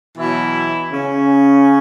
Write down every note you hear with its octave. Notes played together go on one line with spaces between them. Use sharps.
B2 E3 F#3 E4
C#3 C#4